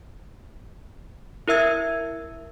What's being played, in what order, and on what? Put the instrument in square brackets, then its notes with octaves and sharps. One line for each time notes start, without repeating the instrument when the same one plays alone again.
[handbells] E4 A#4 E5 E6 G#6